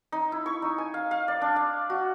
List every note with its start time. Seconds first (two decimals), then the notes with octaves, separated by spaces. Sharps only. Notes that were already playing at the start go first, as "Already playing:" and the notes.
0.12 D#4
0.32 E4
0.46 C#6
0.62 D#4
0.78 G#5
0.94 F5
1.11 F5
1.28 D5
1.41 D4
1.56 F5
1.90 F#4